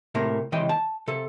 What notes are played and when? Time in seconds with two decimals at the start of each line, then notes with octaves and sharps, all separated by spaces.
0.15 A2 C3 A#3 A#4
0.52 C#2 C3 E3 D#5 G5
0.69 A5
1.08 C3 A4